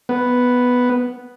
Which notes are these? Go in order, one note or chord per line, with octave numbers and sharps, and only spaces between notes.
B3